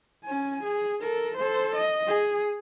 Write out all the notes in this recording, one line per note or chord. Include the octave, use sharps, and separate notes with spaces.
C#4 G#5
G#4
A4 A#4
A4 C5
D#5
G#4